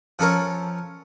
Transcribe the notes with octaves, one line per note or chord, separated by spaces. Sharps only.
F3 C#4 A4 A#4 C#5